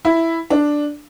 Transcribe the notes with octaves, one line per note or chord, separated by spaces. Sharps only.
E4
D4